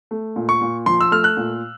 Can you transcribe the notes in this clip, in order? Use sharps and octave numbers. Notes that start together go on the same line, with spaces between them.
A3
A#2
C#6
A#2
F3 C6
E6
A3 F6
F#6
A#2